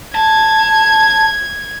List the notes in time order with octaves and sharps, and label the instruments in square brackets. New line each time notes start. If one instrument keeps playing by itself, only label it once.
[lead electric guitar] A5 [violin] G#6